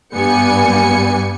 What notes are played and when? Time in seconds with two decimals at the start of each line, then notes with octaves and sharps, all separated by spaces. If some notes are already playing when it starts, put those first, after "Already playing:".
0.14 G2 G3 B3 G#5 C#7